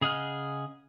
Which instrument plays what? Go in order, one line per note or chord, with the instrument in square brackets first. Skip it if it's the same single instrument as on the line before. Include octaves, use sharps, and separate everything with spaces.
[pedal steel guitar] C#3 G#4 D#5 F#5 F6